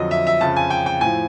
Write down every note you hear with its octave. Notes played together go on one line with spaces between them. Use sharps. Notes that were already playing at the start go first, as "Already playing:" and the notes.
Already playing: F2 D3 F#3 D#5
E5
E5
F2 C#3 F3 A5
G#5
G5
G5
A2 F3 G#5